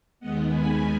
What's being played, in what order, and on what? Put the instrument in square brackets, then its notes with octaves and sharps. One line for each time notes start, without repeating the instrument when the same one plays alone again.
[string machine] D#2 D#3 G#3 B3 D#5 F#5
G#5 B5